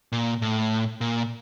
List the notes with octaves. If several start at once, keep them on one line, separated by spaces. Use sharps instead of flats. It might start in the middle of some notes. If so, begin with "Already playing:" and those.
A#2
A2
A#2